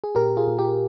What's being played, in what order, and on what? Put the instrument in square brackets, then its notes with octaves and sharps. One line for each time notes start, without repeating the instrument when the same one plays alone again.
[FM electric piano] G#4
A#2 G4 A#4
F4 G#4
A#2
G4